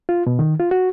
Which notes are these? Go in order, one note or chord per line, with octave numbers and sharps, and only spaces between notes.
F4
B2
D#3
F4
F#4